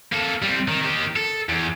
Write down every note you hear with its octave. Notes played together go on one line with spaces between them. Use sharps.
A#3 A4
G3 C4
D#3
D#3 G4
A4
E2